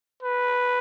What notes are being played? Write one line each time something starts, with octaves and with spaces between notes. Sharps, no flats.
B4